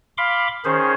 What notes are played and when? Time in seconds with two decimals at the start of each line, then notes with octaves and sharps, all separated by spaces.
0.18 F5 B5 C6 D6
0.65 D#3 C#4 G#4 C5